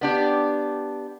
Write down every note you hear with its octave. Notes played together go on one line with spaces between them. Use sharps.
B3 D4 G4